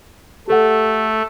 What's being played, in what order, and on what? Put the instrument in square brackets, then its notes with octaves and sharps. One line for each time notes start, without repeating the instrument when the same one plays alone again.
[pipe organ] A3 [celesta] G4 A4 F#5